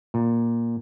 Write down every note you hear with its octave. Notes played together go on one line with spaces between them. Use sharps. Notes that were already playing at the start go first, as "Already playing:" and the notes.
A#2